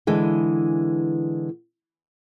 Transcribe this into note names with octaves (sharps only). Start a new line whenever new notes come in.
D3 E3 G#3